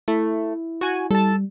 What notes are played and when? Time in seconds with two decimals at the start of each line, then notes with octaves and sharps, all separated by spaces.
0.08 A3 E4
0.81 F#4 G#5
1.11 G3 A4 A5